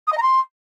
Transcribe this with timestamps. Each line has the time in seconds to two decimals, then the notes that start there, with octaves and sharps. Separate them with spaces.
0.07 D#6
0.12 D#5
0.17 A#5
0.22 C6